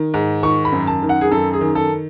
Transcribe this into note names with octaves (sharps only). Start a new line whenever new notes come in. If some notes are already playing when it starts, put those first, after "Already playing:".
Already playing: D#3
G#2
D#3 C#6
B5
F#2
A5
D#3
F#5
G#4
F#2 A4
G#4
D#3
A4